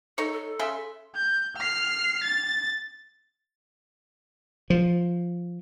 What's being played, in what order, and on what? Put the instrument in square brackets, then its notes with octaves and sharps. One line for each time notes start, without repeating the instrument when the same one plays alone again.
[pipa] D#4 C#5 [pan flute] A4
[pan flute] A4
[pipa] C#3 E5 C6
[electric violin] G6
F6 C7
A6
[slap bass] F3